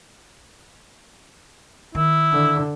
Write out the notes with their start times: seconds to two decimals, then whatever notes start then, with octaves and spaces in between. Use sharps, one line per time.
1.95 D#3 E4
2.32 D3